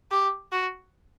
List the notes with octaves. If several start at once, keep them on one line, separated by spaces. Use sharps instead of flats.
G4
F#4